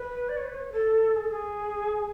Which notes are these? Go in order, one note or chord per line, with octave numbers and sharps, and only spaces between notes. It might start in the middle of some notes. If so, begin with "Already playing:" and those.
Already playing: B4
D5
C#5
B4
C#5
A4
G#4
A4
G#4